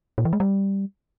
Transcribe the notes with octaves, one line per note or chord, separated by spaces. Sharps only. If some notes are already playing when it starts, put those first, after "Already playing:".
A#2
E3
G#3
G3